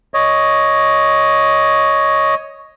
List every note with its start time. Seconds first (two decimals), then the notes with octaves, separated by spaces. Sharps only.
0.14 C#5 D#5